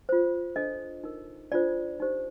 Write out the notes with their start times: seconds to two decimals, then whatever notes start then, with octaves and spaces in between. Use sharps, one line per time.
0.09 F4 C5
0.56 D4 A4 C5 D#5
1.04 D#4 A#4
1.52 D4 F4 A4 C5 D5
2.00 D#4 G4 C5